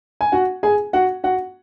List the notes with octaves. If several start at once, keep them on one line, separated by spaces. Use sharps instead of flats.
G#5
F#4 F#5
G#4 G#5
F#4 F#5
F#4 F#5